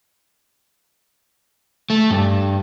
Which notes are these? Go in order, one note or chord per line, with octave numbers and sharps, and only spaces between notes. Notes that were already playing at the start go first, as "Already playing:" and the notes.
A3
G2